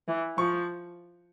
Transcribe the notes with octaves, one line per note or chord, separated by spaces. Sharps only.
E3
F3 C#6